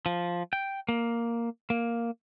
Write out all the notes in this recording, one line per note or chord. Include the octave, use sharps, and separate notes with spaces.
F3
G5
A#3
A#3